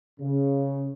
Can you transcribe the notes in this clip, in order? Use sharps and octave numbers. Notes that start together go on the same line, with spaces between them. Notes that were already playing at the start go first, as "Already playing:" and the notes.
C#3